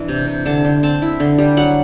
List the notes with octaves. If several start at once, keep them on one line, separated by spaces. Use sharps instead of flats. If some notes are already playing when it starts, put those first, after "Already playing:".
Already playing: E3 D4
C3
C3
D3 A5
D3
C4 A5
E4
D3
G3
F#3 F#5